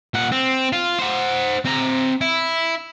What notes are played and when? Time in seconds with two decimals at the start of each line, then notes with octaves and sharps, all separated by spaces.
0.14 A#2 F#5
0.32 C4
0.72 F4
0.99 C5 F#5
1.65 C4 A#5
2.21 E4